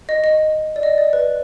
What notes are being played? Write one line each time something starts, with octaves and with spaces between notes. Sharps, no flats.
D#5
D#5
D5
D#5
D5
B4